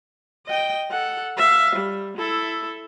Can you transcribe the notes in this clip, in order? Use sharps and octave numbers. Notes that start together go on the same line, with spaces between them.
D#5 G5
A4 F#5
E5 F5
G3
E4 A4